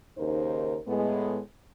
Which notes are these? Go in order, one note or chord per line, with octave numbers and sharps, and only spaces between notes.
D#2 C#3 D#4 A#4 C5
A2 G#3 B3